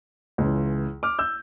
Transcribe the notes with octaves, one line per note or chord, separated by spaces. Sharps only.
C#2 C#3 E3
D6 F6
E6 G6